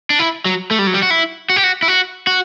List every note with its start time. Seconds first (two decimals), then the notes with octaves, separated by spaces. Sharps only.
0.10 D4
0.19 E4
0.45 F#3
0.71 A3
0.79 G3
0.87 F#3
0.94 G3
1.02 F#4
1.10 E4
1.50 F#4
1.56 G4
1.64 F#4
1.82 E4
1.88 F#4
2.27 F#4